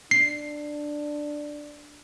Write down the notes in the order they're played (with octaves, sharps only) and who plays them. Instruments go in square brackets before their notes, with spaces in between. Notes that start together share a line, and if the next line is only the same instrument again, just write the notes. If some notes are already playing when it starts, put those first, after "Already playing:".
[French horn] D4 [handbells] C7